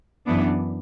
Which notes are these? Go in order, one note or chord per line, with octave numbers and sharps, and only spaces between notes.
F#2 E3 B3 D4